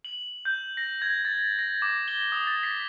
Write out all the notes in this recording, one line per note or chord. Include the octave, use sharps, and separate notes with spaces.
F#7
G6
A#6
G#6
A6
A#6
D6
G7
D#6
A6
B6